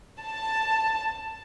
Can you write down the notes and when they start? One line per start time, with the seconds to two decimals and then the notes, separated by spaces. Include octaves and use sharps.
0.22 A5